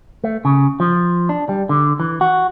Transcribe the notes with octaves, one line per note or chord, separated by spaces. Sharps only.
A3
C#3
F3
D4
G3
D3
E3
F#4